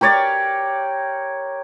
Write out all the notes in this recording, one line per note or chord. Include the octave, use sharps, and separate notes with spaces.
G4 A#4 C#5 D5